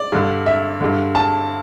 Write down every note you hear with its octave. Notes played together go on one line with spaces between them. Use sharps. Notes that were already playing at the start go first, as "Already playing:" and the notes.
Already playing: D5
G2 D3
E5
G2 D3
A5